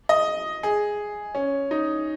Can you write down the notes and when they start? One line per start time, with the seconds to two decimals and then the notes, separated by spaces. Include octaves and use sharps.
0.09 D#5
0.63 G#4
1.35 C#4
1.71 D#4